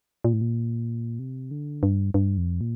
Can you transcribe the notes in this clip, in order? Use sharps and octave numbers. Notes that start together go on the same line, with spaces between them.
A#2
A2
A#2
C3
D3
G2
G2
F2
A#2